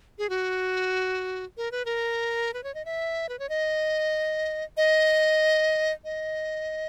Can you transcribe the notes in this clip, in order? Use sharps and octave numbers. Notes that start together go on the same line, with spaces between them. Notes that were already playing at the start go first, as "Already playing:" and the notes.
G#4
F#4
A#4
B4
A#4
B4
C#5
D#5
E5
B4
C#5
D#5
D#5
D#5